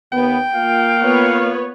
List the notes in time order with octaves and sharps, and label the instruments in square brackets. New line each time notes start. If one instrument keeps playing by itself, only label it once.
[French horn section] D#2 B3 [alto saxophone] G5
[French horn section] A#3 F4 [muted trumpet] F5
[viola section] B3 B4 C#5